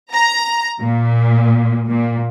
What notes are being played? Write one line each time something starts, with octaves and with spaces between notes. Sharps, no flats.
A#5
A#2
A#2